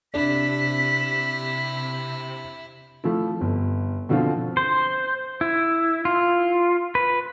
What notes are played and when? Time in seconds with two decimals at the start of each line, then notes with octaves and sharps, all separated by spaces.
0.14 C3 D4 E4 B6
3.04 F3 A3 E4
3.41 G1
4.09 B2 D3 F3 C4 F4
4.57 C5
5.41 E4
6.05 F4
6.95 B4